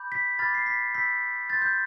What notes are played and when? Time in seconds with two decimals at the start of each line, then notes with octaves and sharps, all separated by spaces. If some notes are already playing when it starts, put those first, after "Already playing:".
Already playing: B5 D6 G6
0.12 B6
0.39 B5 D6 F6 A6
0.54 C7
0.66 B6
0.94 B5 E6 G6 B6
1.49 C6 G6 A6
1.62 G6